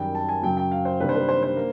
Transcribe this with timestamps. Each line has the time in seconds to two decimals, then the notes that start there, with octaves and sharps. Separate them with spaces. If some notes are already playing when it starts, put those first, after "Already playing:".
Already playing: F#2 D#3 G3 G5
0.15 A5
0.29 G#5
0.43 F#2 C#3 F#3 G5
0.57 G5
0.72 F5
0.85 C5
1.00 C3 D#3 G3 A#3 D4 B4
1.09 C5
1.15 B4
1.29 C5
1.43 C5
1.56 A#3